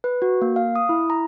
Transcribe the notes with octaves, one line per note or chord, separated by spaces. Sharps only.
B4
F#4
A#3
F5
D#6
E4
A#5